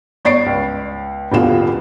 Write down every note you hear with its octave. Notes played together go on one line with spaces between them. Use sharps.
G1 C#5 D5 A6 C7 D7
C#2
D#1 E2 B2 D3 F4 E7